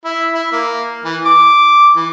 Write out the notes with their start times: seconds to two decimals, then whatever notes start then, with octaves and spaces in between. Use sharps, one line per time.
0.04 E4
0.34 E4
0.52 A#3
1.05 E3
1.25 D6
1.96 E3